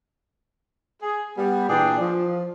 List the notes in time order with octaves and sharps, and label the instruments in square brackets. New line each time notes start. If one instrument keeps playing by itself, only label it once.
[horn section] G#4
G3 B3
A#2 E3 D4 G#4 D5 G5
F3